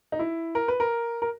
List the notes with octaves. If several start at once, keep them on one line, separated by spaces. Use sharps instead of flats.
D#4
E4
A#4
B4
A#4
A#4